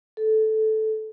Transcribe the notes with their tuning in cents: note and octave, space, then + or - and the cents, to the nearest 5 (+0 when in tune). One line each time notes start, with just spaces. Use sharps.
A4 -10